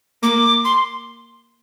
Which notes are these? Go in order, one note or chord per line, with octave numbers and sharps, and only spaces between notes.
A#3 D6
C6